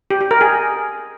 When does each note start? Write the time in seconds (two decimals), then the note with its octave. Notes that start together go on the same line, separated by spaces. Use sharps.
0.10 G4
0.21 G4
0.31 A#4
0.41 G#4